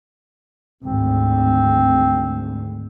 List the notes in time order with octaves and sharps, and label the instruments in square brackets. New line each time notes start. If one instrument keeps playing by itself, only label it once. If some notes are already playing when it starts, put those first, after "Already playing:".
[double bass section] G#1 D2 [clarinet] C4